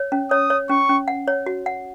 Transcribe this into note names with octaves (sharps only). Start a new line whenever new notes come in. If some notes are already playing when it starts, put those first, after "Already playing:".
Already playing: C#5
C#4
C#5 D#6
C#5
C#4 C#6
C#4
F#5
C#5
F#4
F#5